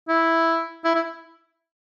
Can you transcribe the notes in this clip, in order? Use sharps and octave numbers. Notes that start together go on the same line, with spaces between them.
E4
E4
E4